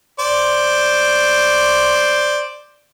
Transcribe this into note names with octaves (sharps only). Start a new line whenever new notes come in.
C5 D5